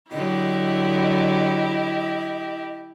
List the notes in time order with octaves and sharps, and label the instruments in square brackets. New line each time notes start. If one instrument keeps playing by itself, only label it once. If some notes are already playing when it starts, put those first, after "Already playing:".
[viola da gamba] D3 F#3 [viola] E4 G4 [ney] D#5